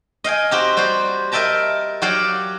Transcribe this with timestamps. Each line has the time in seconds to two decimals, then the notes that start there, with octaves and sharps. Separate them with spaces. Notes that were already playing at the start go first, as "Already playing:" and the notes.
0.24 D#5 F5 G5 G#5
0.51 C4 F#4 G4 A#5
0.77 G3 F#4 G4 C5
1.32 A#4 D#5 E5 G5 A5 A#5
2.02 F#3 F#4 G4 D5 F5 F#5